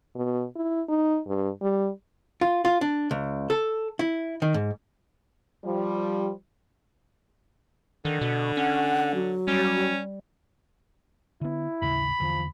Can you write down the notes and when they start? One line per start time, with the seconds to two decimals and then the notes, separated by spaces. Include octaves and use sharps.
0.15 B2
0.56 E4
0.89 D#4
1.28 G2
1.62 G3
2.41 F4
2.65 F4
2.81 D4
3.11 C#2
3.50 A4
3.99 E4
4.42 D#3
4.54 G#2
5.65 F3 G3
8.05 D3 D#3
8.21 B2
8.57 C#4 F#5
9.15 F#3
9.48 G3 C#4
11.41 D3 B3 E4
11.82 A1 D#2 C#3 B5
12.20 E2 D3 E3 F3